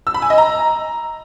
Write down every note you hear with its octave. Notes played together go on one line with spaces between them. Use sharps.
E6
B5
G#5
D#5
A#5